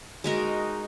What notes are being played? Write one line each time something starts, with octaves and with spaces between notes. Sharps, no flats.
G#3 D#4 F#4 A#4